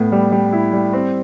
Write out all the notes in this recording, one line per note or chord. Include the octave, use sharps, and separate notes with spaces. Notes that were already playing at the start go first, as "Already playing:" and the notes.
Already playing: A2 B3
G3
G3
E4
G3
C4